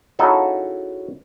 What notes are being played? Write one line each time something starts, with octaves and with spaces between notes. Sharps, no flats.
C#3 F#3 D#4 E4 A4 G#5